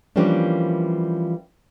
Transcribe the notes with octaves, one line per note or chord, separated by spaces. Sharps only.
E3 F3 G3 A#3 C#4 D4